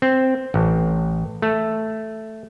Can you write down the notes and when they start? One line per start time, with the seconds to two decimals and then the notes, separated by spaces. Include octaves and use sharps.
0.02 C4
0.54 A1
1.42 A3